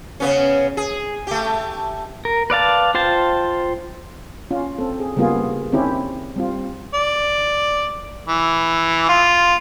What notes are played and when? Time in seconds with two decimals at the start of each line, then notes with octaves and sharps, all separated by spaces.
0.20 C#3 B3 C#4
0.77 G#4
1.27 A3 G4
2.25 A#4
2.50 B4 D5 F5 A5
2.94 F4 C5 G5 A5
4.51 C#4 F4
4.78 C4 A4
5.00 G#4
5.16 C#3 G3 A#3 B3 F4 G#4
5.72 D#3 C4 C#4 E4 G4
6.36 G3 C4 F4
6.94 D5
8.28 E3
9.09 F4